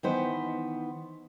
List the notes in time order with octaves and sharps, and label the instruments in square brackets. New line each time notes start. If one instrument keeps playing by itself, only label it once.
[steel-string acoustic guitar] D#3 E3 B3 C5